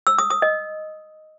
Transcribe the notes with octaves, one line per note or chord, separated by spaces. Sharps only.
E6
D#6
D#6
D#5